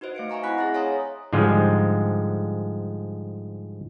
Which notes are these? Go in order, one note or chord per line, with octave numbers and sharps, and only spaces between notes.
D#4 F#4 B4 C5 D#5
A3 F5 C#7 D7
D#5 E5 G#5 A#5 C#6
C4 E4 F#5 B5 F#6 B6
G#4 E5 A6 A#6
C#5 F5 G#5 A#5 C6 D#6
G#2 D3 F3 G3 G#3